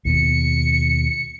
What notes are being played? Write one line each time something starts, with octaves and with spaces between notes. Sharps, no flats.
D#2 B2 C#7